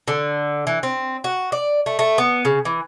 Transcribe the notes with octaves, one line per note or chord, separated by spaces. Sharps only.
D3
E3
C4
F#4
D5
A3
A3
B3
C#3
E3